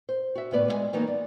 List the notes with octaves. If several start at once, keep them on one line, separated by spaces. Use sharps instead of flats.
C5
F#4 E5
D2 A2 B3 B4 D5
G#3 E5 G#5
E3 F#3 A#3 B3 D#4
D5